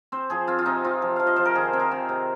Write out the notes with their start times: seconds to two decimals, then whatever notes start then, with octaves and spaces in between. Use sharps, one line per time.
0.12 C4 C5
0.30 F3 G#4
0.48 C4 F4
0.59 F4
0.66 C3 D#4
0.84 C3 F4
1.02 F3
1.16 F3 F5
1.27 D#5
1.36 F3 C5
1.45 A#4
1.55 D#3 G#4
1.73 C4
1.80 A#4
1.91 D#3
2.09 C3